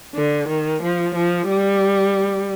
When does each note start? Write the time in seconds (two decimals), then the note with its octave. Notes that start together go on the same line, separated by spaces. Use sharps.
0.15 D3
0.48 D#3
0.82 F3
1.15 F3
1.48 G3